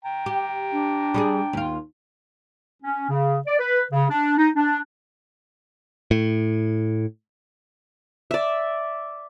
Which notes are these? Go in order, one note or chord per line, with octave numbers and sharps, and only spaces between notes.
G5 A#5
G4
D4
G3 G4 G#4
D#2 F4
C#4
C#3
D5
B4
C#3
D4
D#4
D4
A2
D5 E5